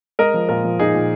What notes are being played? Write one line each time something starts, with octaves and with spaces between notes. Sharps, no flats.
G#3 A#4 D#5
F3
A#2 F4 A#4
F3
A#2 D#4 G#4
A#2